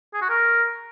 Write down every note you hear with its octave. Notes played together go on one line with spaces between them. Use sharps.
G#4
F#4
A#4